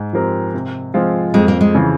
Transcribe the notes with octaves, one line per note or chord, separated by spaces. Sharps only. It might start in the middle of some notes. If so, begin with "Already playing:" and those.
Already playing: G#2
F3 C4 G4 A#4
C3
F3 G#3 C4 F4
F2 G#3
A#3
G#3
C#3 E3